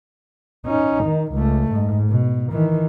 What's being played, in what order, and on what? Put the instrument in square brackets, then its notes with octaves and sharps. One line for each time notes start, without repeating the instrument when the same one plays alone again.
[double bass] C#4 D#4
D#3
C#2 A3
G#2
B2
D#3 E3